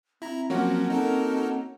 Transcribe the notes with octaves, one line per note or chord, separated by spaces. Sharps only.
C4 E4 A#5
F3 F#3 A#3 C#4 F#4
D#4 A4 A#4